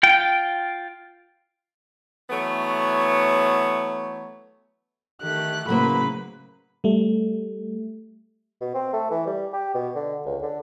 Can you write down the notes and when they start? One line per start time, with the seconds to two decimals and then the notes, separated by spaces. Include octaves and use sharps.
0.03 F4 G5
2.30 E3 F#3 A3 B3 C#5
5.22 D#3 A3 G4 F#6
5.68 A2 C#3 F#3 A#3 B4 C5 B5
6.84 G3 A3
8.61 B2
8.74 C4
8.93 A3
9.11 E3
9.27 G3
9.53 G4
9.74 B2
9.96 D3
10.25 C#2
10.42 D3